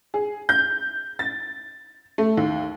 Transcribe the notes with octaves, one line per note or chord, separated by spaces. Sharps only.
G#4
G6
A6
A3
D#2